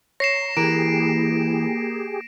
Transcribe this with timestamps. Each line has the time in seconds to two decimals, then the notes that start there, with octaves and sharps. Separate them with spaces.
0.20 C#5 A#5 A#6 C7 E7
0.57 E3 A#3 G4 G#4 D7